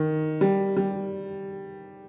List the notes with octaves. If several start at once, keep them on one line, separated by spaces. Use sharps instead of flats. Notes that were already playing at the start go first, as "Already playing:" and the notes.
Already playing: D#3
G3
G3